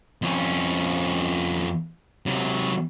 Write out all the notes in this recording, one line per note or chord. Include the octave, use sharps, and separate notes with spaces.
F2 C#4
C3 F#3